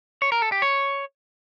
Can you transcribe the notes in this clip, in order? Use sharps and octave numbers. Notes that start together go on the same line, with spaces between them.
C#5
A#4
A4
G4
C#5